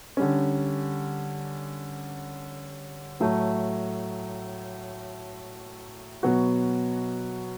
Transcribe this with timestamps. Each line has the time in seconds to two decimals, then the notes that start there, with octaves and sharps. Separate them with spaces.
0.17 D3 G3 C#4
3.20 A2 F#3 A3
6.23 B2 F#3 B3 F#4